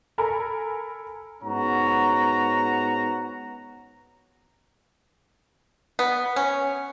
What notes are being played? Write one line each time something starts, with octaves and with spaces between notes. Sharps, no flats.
A4 A#4 G#5 A#5 B5
G#2 B3 C#4 F#4 A#5
B3
C#4